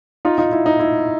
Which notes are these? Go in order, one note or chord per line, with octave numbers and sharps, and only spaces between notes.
D#4 F4
D#4 F4
E4
D#4
E4